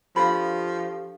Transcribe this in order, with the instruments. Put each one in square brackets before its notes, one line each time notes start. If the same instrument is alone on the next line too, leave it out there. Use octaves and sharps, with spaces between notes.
[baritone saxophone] F3 [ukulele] D4 B5 [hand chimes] G4 A4 F5